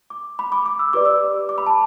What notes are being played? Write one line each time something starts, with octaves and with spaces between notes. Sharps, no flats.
D6
B5
D6
D6
E6
G4 B4 D5 D6
E6
D6
B5
A5